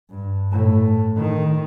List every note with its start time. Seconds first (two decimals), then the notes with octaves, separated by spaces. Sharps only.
0.10 G2
0.52 A2
1.17 D#3